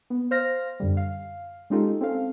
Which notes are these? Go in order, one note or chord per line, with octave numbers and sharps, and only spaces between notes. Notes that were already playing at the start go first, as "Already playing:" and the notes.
B3
C5 F5 F6 A#6
F#2 D3 G3
F5
G#3 C#4 D#4 F4 G4 A4
C4 C#4 A4 F5